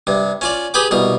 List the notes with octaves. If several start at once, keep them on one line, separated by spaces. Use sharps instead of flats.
G2 C3
C#4 F4 D5
G4 G#4 B4 G5 D6
C2 B2 A#4